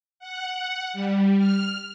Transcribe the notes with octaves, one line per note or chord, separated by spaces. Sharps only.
F#5
G3
F6